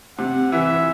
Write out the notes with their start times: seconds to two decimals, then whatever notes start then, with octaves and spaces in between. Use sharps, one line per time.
0.18 C3 F#5
0.52 E3 E5